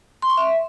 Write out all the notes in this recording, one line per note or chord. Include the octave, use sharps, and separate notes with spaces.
C6
C#6
E5